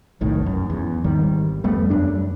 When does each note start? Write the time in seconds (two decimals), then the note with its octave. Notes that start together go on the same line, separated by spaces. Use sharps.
0.21 F1 B1 A2 D#3
0.46 F#2
0.70 E2
1.04 G#1 D#3 G3
1.64 F2 G3 A3 B3
1.90 F#2 D4